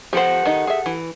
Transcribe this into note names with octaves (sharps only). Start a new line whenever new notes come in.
F3 G4 A4 C5 F#5
D#3 D#4
G#4 E5
E3